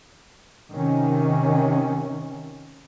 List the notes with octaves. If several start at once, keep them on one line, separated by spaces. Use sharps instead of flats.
C3 D#3 C#4